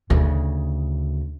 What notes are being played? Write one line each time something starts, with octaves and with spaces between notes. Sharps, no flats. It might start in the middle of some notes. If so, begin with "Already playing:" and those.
D2 C#3